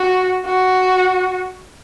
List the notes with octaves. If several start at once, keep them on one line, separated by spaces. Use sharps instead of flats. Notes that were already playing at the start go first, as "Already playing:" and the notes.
Already playing: F#4
F#4